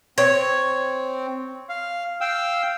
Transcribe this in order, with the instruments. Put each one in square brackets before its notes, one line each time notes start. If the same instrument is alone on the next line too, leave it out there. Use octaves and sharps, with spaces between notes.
[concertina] C4 [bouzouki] C#5
[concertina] F5
F5 G5 E6